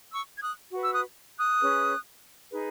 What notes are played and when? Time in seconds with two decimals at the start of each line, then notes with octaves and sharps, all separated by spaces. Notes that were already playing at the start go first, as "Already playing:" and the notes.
0.11 C#6 E6
0.37 G#6
0.41 D#6 F#6
0.71 F#4 B4
0.84 E6
0.94 D#6 F#6
1.39 D#6 F#6
1.61 C#4 G#4 B4
2.51 D#4 G#4 B4